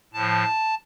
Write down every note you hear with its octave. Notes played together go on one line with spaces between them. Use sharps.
A2 F3 A5